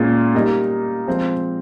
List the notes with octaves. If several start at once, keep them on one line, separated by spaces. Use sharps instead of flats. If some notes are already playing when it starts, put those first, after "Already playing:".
Already playing: A#2 G#3 C#4 F4
G3 A#3 D#4
F3 G#3 C4 F4